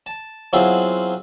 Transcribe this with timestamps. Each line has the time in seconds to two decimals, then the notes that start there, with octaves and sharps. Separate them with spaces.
0.06 A5
0.53 F#3 B3 C4 E4 F4 G#4